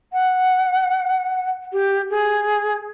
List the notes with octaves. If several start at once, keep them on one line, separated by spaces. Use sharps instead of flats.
F#5
G4
G#4